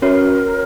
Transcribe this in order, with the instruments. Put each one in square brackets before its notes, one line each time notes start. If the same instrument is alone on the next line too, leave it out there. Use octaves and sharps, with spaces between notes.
[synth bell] C#4 F#4 C#5 [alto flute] A#4